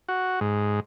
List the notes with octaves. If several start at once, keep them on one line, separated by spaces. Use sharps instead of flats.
F#4
G#2